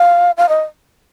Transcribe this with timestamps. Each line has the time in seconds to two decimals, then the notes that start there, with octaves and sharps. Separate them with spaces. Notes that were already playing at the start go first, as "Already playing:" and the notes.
Already playing: F5
0.37 F5
0.49 D#5